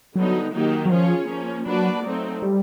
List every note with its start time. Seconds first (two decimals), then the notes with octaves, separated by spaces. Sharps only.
0.15 D3 F#3 G3 B3 D#4
0.53 D#3 F#3 A#3 D#4 G4
0.86 F#3
0.91 F3 C#4 F4 G#4 C#5
1.29 F3 A#3 C#4
1.66 F#3 A#3 D4 F#4 B4 D5
2.04 F#3 A3 C4 D#4
2.42 G3